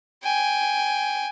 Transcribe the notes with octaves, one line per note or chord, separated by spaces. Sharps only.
G5 G#5